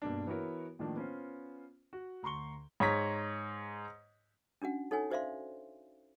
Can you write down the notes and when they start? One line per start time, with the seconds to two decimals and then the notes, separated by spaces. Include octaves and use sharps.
0.02 G2 B2 A#3 D4
0.26 E3 B3 E4 F#4 A#4 C#5
0.79 A2 D#3 F3 A3 A#3 D4
0.96 B3 C#4 F4 C5
1.93 F#4
2.23 D2 A#5 C6 C#6 G7
2.80 G#2 C#5 A#5 B6
4.62 C#4 D4 F#4 F#5
4.91 D#4 A4 C#5 F#5 G#5
5.11 F#4 C5 D5 E5 F5 C6